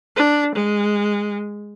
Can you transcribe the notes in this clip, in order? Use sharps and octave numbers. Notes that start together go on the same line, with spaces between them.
D4
G#3